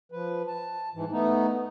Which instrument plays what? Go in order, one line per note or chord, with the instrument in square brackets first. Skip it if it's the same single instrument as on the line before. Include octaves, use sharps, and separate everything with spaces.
[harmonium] F3 B4
A5
G#2 E3
A3 B3 D#4